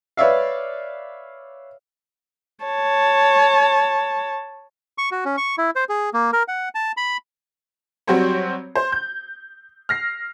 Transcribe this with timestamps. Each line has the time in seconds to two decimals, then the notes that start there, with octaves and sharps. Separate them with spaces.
0.17 B4 C#5 D5 E5 F5
2.65 C#5 A5
4.98 C#6
5.12 F#4
5.25 C#4
5.37 C#6
5.58 E4
5.76 C5
5.89 G#4
6.14 A#3
6.33 A#4
6.48 F#5
6.75 A5
6.97 B5
8.07 F#3 G3 C4 F#4 C5 C#5
8.75 C5
8.92 G6
9.89 F6 A#6 C7